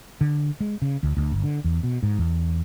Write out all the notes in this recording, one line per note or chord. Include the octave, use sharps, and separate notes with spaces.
D3
G#3
C#3
D2
D2
G1
D3
E2
B2
G#2
E2